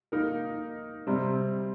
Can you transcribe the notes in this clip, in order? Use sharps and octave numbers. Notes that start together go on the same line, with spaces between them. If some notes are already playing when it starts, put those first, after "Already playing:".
A#3 D#4 A#4
C3 G3 C4